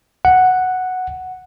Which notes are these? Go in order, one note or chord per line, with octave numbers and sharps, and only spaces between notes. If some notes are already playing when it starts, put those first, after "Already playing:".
F#5